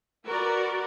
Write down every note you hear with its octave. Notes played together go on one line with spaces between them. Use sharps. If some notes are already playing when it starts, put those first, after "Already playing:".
F#4 A#4 B4 D5 A#5